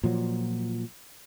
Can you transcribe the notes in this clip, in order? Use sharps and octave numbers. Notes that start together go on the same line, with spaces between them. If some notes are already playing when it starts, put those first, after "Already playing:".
A#2 F3 F#3